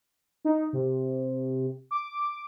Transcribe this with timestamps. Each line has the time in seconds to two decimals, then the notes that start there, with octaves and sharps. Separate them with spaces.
0.45 D#4
0.73 C3
1.91 D6